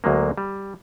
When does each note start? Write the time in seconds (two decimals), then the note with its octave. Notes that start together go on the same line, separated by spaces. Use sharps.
0.04 D2 F#3 G#3 A#3
0.38 G3